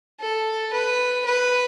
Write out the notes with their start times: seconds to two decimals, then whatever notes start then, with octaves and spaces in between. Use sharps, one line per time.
0.20 A4
0.73 B4
1.26 B4